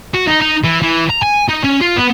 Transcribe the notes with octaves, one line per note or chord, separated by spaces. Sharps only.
F#4
D#4
D#4
E3
E3
A#5
G#5
D#4
C#4
F4
B3